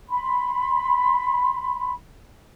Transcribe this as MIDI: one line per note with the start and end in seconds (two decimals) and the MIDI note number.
0.09 1.93 83
0.09 1.93 84